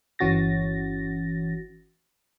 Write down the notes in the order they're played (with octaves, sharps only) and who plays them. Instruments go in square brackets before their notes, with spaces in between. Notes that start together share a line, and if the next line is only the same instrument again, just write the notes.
[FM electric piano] G1 E3 C#4 F#4 A6 A#6